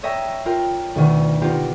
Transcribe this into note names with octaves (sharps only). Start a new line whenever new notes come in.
C#5 D#5 E5 G5 A#5
F4 A#4 G5
D2 B2 D#3
B3 D#4 F4 G4